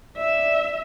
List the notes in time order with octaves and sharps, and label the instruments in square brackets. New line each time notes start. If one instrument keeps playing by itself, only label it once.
[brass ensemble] D5 [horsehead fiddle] E5